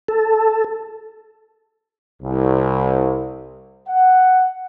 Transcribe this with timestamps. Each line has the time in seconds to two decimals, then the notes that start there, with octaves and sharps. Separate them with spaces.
0.08 A4
2.23 C2
3.89 F#5